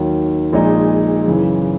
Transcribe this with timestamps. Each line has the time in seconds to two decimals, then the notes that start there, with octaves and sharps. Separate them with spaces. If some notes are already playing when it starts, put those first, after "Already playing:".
Already playing: D#2 D#3 F#3
0.53 A#1 A#2 G#3 D#4
1.28 F#2 C#3 E3